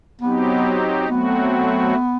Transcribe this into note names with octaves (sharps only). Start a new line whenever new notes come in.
F#3 B3 C4 D#4 G4
F#3 A3 B3 C4 F#4